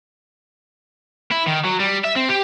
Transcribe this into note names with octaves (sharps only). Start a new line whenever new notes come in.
E4
D#3
F#3
G3
E5
C4
G4